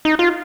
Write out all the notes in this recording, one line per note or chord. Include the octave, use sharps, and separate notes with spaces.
D#4
F4